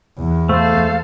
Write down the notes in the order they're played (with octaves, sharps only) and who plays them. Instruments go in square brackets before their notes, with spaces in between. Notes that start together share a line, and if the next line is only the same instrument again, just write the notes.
[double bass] E2
[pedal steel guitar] A3 [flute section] A4 C5 F5